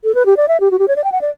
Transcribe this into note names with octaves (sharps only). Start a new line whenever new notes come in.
A4
B4
G4
D5
E5
G4
F#4
G4
C#5
D5
G5
F#5
D5